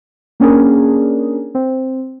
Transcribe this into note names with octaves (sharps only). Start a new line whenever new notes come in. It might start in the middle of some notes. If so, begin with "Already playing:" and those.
A#3 C#4 D4 G#4 A#4
C4